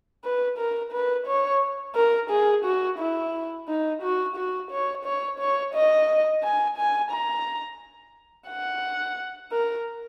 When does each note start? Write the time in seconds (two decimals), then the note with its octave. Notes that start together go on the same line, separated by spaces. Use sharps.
0.24 B4
0.58 A#4
0.92 B4
1.27 C#5
1.95 A#4
2.30 G#4
2.65 F#4
2.99 E4
3.68 D#4
4.02 F#4
4.36 F#4
4.71 C#5
5.05 C#5
5.39 C#5
5.74 D#5
6.43 G#5
6.77 G#5
7.11 A#5
8.48 F#5
9.52 A#4